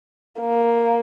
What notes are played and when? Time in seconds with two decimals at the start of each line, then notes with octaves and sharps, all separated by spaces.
0.40 A#3